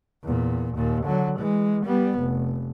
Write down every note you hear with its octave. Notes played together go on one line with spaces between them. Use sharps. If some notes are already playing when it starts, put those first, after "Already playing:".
E2 A#2
D#2 A#2
D3 F#3
E3 G#3
G3 B3
F1